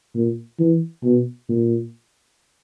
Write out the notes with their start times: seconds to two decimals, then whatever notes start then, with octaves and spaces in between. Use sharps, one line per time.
0.15 A#2
0.60 E3
1.04 B2
1.49 A#2